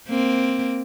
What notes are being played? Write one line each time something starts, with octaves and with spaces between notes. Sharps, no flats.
A#3 C4